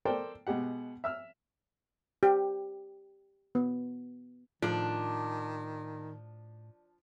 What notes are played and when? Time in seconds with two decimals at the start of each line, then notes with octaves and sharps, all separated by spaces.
0.05 A4 A#4 C5 D5 G5
0.47 B2 G#3 G4 F#5
1.04 E5 E6 F6
2.23 G4
3.55 B3
4.62 A2 D#3 F3 D4